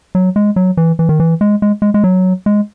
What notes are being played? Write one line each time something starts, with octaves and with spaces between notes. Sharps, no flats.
F#3
G#3
F#3
E3
E3
D#3
E3
G#3
G#3
G#3
G#3
F#3
G#3